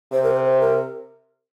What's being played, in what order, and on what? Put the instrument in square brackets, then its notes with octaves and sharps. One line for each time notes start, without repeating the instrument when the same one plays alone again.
[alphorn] C3 [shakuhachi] C5
[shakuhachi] A#4
C5
C5
A#4